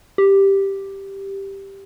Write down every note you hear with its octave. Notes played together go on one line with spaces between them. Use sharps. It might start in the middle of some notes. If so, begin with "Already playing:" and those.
G4